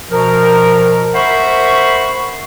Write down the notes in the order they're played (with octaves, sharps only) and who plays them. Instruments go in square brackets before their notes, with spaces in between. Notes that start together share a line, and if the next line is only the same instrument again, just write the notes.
[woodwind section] B2 F3 A#4
A#4 C5 E5 F#5 B5 C#6